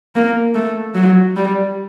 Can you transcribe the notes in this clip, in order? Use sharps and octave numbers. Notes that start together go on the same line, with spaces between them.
A#3
A3
F#3
G3